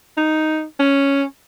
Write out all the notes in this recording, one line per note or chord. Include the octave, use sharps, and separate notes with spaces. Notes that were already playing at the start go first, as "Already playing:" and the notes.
D#4
C#4